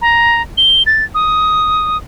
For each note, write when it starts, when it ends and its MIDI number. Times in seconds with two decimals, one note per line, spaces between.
0.01 0.42 82
0.57 0.83 103
0.86 1.04 93
1.14 1.97 87